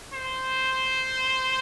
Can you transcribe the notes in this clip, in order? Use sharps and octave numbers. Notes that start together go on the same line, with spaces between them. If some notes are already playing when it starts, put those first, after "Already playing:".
C5